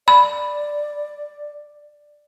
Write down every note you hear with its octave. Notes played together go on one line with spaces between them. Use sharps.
D5 B5